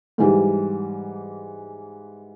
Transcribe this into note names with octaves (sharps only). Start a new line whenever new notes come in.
G#2 E3 G3